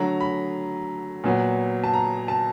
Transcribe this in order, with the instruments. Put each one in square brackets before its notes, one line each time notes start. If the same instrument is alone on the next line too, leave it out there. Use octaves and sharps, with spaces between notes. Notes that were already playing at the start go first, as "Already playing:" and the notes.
Already playing: [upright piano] D3 F#3 A3 A#5
B5
A#2 F#3 B3
A5
A#5
A5